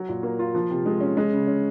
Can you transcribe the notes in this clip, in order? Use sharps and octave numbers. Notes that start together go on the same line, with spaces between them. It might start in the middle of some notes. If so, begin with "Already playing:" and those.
Already playing: F#3
A#2
A#3
F4
F3
C3
G#3
C#4
G#3
C#3
C#4